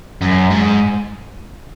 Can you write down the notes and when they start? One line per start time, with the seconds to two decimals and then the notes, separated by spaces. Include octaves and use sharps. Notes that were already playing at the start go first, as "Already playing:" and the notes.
0.21 F#2
0.50 G#2